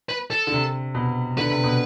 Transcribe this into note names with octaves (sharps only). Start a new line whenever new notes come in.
B4
A4
D3
C3
B2
D3 B4
C3
B2